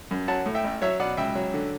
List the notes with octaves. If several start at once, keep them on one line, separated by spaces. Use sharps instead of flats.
F#2
F#3 F#5 A5
A2
E5 G5
A1
F#3 C#5 E5
B2 D5 F#5
C#2 E5 G5
F#3
D3